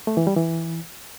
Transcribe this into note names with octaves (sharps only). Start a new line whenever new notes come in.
A3
E3
G3
E3